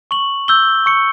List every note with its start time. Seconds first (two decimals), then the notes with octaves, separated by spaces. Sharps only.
0.11 C#6 F#7
0.48 E6 G6 G7
0.86 C#6 C#7